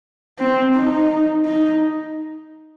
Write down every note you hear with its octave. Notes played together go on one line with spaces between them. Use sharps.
C4
D#4
D#4